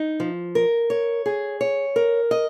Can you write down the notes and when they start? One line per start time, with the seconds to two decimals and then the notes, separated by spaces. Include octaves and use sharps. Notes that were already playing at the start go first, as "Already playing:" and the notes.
Already playing: D#4
0.20 F3
0.55 A#4
0.90 C#5
1.26 G#4
1.61 C#5
1.96 A#4
2.31 D#5